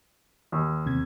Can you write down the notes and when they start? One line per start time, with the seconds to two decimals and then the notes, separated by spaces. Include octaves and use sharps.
0.52 D#2
0.86 E2 C3 G#6